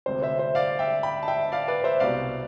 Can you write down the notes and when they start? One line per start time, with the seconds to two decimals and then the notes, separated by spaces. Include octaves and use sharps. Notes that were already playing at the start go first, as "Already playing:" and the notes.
0.06 D2 C3 G3 C5
0.22 C5 E5
0.39 C5 E5
0.55 D5 F5
0.79 E5 G5
1.03 G5 B5
1.23 A5
1.28 E5 G5
1.52 D5 F5
1.68 B4 D5
1.84 C5 E5
2.00 C2 B2 G3 D5 F5